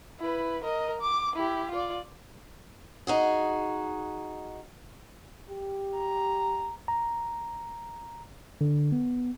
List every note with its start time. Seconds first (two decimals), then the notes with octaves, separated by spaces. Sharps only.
0.20 E4 B4
0.64 A#4 D#5
1.01 D6
1.36 E4 G4
1.71 F4 D5
3.07 D#4 F#4 G#4
5.49 G4
5.95 A#5
6.88 A#5
8.61 D3
8.92 B3